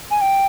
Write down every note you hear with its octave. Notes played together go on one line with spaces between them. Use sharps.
G#5
G5